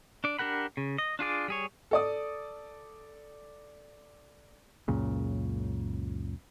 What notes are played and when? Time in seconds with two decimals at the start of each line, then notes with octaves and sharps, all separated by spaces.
0.24 D4 D5
0.39 D4 G4 A#4 F#5 B5
0.77 C#3
0.98 D#5
1.19 D4 F4 G#4 D5
1.48 G3 G#4 C#5
1.91 A4 D5 D#6
4.88 C#2 F#2 A#2 C#3